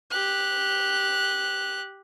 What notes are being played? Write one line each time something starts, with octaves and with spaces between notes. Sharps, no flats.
G4 F#6